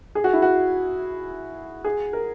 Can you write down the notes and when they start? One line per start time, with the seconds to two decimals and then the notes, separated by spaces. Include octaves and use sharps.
0.15 G#4
0.24 F#4
0.33 E4
0.42 F#4
1.84 G#4
2.13 A#4